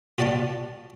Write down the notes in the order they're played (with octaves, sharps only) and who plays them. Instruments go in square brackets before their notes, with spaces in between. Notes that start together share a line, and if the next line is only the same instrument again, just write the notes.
[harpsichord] F4 F#4 D5 F#5 A5